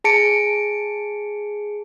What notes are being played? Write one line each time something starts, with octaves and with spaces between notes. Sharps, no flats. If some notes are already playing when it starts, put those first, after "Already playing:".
G#4 A5 C#7 D7